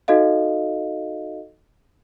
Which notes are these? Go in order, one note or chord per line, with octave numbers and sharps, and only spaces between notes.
D#4 F#4 A4 D#5 F5